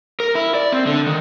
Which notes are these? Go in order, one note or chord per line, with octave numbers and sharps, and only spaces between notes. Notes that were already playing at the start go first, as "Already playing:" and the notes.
A#4
E4
D5
C4
D3
D#3